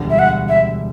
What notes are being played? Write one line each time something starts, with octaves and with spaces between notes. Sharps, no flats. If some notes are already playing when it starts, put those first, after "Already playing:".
Already playing: E1 D2 D3 G3
E5
F#5
E5